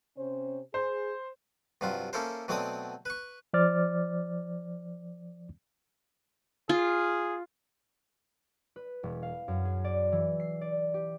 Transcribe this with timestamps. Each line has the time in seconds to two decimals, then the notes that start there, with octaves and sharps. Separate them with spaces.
0.17 C3 C#4 C5
0.74 G#4 C5
1.81 G2 C3 F#3 F4
2.13 A#3 C#4 E4 A4 A#4 C5
2.48 B2 F#3 A3 C4 D5 D#6
3.05 B4 C#6
3.53 F3 C5 D5 D6 F6 A6
6.69 F4 G#4
8.76 B4
9.03 E1
9.23 F5
9.48 F#2
9.65 G#4
9.84 D5
10.12 E3
10.40 C7
10.61 D5
10.94 G4